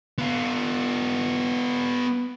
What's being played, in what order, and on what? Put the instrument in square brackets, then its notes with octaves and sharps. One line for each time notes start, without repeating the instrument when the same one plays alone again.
[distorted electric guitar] B3 F4